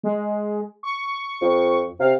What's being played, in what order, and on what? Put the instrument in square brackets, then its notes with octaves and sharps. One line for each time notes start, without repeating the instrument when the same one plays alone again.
[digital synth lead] G#3
C#6
[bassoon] F2
[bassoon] C3 [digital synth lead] F5